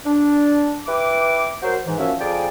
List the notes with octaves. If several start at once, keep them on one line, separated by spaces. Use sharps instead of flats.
D4
E4 B4 G5 D6
F#3 F#4 A#4 C5
G#2 E3
F3 F#3 A#3 C#4 E5
F2 F3 G#4 D5 G5 G#5